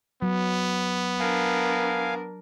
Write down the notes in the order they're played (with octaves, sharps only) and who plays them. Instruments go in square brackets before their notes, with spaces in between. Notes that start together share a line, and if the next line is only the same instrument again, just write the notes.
[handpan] F#3 [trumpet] B3
[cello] D4 A#4 [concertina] F5 G#5